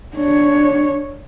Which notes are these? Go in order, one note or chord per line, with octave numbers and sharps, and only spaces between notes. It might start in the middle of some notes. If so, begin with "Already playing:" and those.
D4 C#5